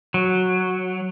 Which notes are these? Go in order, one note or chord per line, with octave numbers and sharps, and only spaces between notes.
F#3